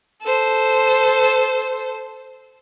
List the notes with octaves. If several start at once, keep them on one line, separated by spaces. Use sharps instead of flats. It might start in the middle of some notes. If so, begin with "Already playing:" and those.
A4 C5